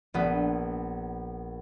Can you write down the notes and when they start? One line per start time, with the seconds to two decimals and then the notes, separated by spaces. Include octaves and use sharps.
0.14 A#1 B3